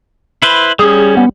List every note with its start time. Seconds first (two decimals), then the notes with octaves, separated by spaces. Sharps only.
0.42 E4 B4 C5
0.79 G3 C#4 G#4
1.17 B3